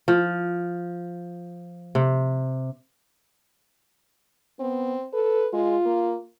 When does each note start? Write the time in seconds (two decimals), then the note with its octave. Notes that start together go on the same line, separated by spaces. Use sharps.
0.08 F3
1.95 C3
4.60 B3 C4
5.13 A4 B4
5.54 G#3 F4
5.86 A#3